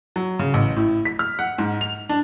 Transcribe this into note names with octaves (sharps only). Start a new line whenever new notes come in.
F#3
C#3
A1
A2
B6
F6
F#5
G#2
F7
D4